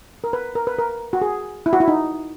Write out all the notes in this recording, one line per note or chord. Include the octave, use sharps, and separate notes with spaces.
A#4
B4
A#4
B4
A#4
F#4
G#4
E4
F#4
E4
D#4